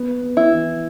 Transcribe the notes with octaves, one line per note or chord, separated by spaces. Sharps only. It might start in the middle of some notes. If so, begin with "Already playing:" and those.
Already playing: B3
B3
E4
E3